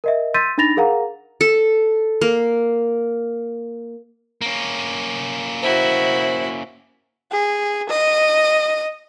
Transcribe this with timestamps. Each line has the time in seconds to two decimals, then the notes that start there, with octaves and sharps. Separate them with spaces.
0.04 A#4 D#5 E5
0.34 C6 E6 G6 A6 B6 D#7
0.58 D4 D#4 B5 A6 A#6 F7
0.77 G#4 A#4 F5 F#5 A#5
1.41 A4
2.22 A#3
4.41 A#3 C#4
5.62 E4 F#4 C5
7.32 G#4
7.89 D#5